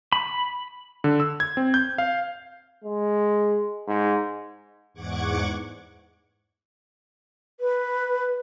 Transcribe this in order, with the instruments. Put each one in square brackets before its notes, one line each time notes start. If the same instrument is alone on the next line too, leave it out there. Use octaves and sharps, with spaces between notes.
[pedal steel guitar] B5
[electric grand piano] D3
E6
G#6
C4
G6
F5
[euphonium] G#3
G#2
[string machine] E2 G#2 F#5 C#6 D6 G#6
[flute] B4